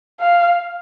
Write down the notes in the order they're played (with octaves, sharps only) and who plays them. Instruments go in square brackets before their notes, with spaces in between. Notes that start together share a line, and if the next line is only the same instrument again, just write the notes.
[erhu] F5